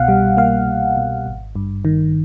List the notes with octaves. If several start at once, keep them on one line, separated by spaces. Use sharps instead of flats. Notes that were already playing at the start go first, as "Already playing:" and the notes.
Already playing: C2 B2 F5 F#5
G3
A#3 F5
C2
B2
G#1
G2
D#3